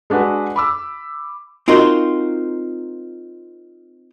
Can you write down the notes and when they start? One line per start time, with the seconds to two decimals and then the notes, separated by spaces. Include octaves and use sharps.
0.10 G#3 D4 F#4 B4 F#5
0.56 B5 D6 E6
1.68 C4 D#4 F4 F#4 A#4 C5